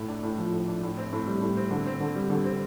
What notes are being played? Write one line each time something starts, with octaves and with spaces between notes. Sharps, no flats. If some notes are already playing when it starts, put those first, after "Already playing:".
Already playing: A2
D4
A2
F3
A2
D4
A2
C4
A2
G3
A2
C4
D3
C4
D3
G3
D3
C4